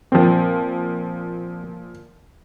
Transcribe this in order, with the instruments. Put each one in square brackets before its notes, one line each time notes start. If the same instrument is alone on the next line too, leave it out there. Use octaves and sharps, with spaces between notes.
[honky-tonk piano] A#2 F3 [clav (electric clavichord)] C4